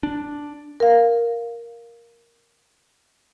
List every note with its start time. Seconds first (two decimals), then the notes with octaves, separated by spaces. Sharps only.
0.03 D4
0.80 A#4 F5